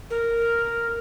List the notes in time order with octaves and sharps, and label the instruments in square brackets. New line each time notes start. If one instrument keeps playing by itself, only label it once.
[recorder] A#4